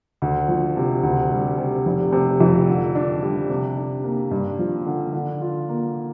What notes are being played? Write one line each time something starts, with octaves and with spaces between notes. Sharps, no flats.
D2
F3
C3
D2
G3
C3
F1
C3
F2
D3
D4
G3
C3
D4
A#3
G2
F3
D3
D3
F4
A#3